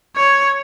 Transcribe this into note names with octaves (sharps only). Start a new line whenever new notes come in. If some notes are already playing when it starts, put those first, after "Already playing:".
C#5